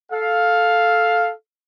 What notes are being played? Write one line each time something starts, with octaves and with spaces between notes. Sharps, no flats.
A4 F5